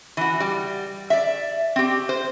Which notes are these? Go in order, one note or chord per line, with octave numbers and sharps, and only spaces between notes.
E3 F#4
G3
D5 E5
C4 G4
C5